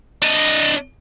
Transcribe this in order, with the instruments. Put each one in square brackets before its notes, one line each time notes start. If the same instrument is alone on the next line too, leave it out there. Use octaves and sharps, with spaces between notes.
[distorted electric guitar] D4 D#5